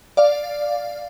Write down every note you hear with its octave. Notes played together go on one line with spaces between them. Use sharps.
D5 F5